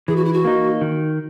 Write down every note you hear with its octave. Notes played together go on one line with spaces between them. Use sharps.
E3 G#4
F#4
E4
F#4
A#3 D#4
D#3